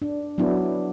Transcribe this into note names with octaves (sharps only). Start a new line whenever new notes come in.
D4
F#3 B3 D4 E4